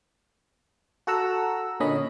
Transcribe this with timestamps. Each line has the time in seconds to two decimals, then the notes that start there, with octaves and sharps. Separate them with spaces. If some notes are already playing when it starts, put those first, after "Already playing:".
1.07 F#4 A4 F#5 A#5 E6
1.80 A#2 D3 C#4 D#5 B5